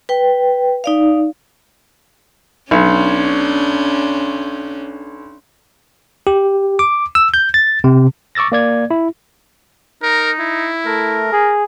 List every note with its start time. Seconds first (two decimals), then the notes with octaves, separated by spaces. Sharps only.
0.09 B4 G5
0.84 D#4 D5 F5
2.71 B1 C#4 D4
6.27 G4
6.79 D6
7.15 E6
7.34 G6
7.54 A6
7.84 C3
8.35 C#6 D6 E6 A6 A#6
8.52 A#3 D5 G#6
8.91 E4
10.03 D#4 A#4
10.40 E4
10.86 A3 A#4
11.32 G#4